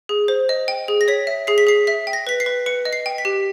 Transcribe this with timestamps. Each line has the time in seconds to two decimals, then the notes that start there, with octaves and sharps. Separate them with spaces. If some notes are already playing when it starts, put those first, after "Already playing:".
0.09 G#4
0.28 C5
0.49 D#5
0.68 G5
0.88 G#4
1.01 A#6
1.08 C#5 B6
1.27 E5
1.47 G#4 C7
1.58 B6
1.67 G#4 C7
1.87 E5 B6
2.07 G5
2.13 A#6
2.27 B4 B6
2.40 C7
2.46 B4
2.66 B4 C#7
2.85 D#5
2.93 C7
3.06 G5
3.18 B6
3.25 G4